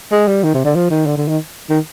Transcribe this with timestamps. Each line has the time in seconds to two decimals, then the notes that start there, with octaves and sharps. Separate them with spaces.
0.12 G#3
0.27 G3
0.43 D#3
0.54 C3
0.65 D3
0.75 F3
0.90 D#3
1.06 D3
1.17 D3
1.28 D#3
1.69 D#3